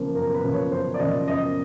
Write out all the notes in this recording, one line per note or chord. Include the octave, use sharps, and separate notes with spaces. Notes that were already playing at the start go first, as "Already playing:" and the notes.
Already playing: C#3 F3 A#3
F#2 A#4
A#4
B4
C#3 F3 A#3
C#5
F#2 C5
D5
C#3 F3 A#3 D#5
F#2 D#5